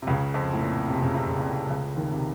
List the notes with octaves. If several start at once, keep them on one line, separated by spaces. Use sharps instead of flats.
C3
C#2 C#3
F2 F3
A2
A#2
C3
C#3
C3
C#3
C2 C3
C#2 C#3
D#2 D#3
C3